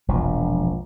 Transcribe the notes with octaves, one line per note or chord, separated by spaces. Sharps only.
E1 A#1 F3